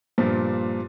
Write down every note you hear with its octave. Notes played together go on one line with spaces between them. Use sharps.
G2 A#2 F3